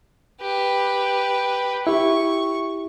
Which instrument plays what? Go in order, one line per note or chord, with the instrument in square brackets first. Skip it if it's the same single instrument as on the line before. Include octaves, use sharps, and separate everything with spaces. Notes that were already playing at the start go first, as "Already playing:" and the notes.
[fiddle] G4 B4
[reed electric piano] E4 G4 [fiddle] C#6